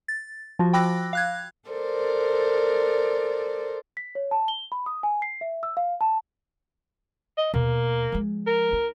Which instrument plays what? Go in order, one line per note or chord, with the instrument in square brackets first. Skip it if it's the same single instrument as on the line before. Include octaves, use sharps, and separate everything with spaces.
[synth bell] A6
F3 F4 F#4
G5 B5 D6 E6 F#6 A#6
F5 F#6 G#6
[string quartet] A4 A#4 C5 D5
[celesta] B6
C#5
A5
G7
B5
D#6
G#5
C7
E5
E6
F5
A5
[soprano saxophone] D#5
[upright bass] D#2 B2 [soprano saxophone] A#3
[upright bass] F3 G#3
[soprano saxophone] A#4
[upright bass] D#4